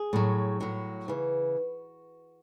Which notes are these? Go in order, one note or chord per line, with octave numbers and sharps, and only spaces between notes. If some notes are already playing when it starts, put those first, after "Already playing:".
Already playing: G#4
A2 F#3
A2 F#3 F#4
C#3 E3